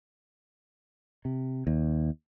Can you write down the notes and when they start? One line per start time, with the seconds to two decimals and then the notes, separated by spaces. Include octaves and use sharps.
1.25 C3
1.67 D#2